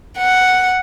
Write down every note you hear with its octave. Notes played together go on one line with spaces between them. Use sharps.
F#5